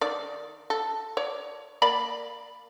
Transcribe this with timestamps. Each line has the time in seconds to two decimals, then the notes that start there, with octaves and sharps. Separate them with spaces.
0.01 D#3 D5
0.70 A4
1.17 C#5 D5
1.82 A#3 D5 B5